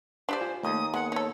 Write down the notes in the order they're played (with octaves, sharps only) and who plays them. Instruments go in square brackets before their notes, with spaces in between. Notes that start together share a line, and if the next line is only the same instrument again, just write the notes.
[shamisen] D4 G4 D5 [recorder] C5
[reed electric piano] F4 G#5
[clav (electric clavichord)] D#2 [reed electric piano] A3 A#3 [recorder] D#6
[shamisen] G#3 [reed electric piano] A#3 B3 [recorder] F#5
[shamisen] D#4 A4 [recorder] C#5